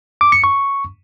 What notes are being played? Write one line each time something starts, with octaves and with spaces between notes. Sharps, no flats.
D6
C#7
C#6